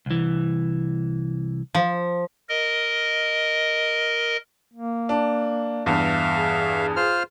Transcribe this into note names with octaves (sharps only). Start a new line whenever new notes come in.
C2 E3
F3
A#4 D#5
A#3
D4
E2 G2 E5 F5
G#4
F4 C5 F6